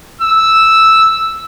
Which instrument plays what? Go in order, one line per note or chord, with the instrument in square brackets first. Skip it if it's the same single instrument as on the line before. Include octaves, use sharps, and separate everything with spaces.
[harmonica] E6